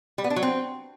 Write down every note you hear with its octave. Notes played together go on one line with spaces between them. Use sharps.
G3
B3
D4
F#3
C4